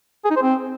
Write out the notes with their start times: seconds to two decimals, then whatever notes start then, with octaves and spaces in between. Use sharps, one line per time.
0.25 G#4
0.31 D#4
0.36 C5
0.42 C4